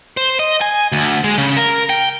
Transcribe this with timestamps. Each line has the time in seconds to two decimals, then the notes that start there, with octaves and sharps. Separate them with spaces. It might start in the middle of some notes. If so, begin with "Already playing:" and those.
0.17 C5
0.39 D#5
0.61 G#5
0.92 D2
1.24 G#3
1.38 C#3
1.57 A#4
1.90 G5